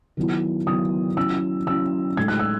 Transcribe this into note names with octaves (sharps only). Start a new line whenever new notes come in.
D#3 F#3 B3 E4
D#3 F#3 B3 E4 D#6
F#3 C#4 E4 E6
F#3 C#4 E4 E6
A2 G#3 D#4 G#6
F#6
E6